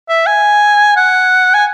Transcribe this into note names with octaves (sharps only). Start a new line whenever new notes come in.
E5
G#5
F#5
G#5